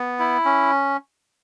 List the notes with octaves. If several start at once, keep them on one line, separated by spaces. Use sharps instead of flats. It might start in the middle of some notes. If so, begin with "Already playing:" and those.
Already playing: B3
E4
C#4